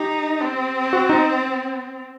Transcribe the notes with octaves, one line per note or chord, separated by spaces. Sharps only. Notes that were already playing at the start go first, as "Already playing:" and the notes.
Already playing: D#4 G4
C4
F#4
D#4